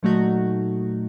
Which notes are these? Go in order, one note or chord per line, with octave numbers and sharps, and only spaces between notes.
A#2 F#3 A3 D#4 F#4